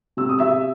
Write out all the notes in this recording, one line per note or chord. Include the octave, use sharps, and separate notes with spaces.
C3 E6
D#6
C3 E5 E6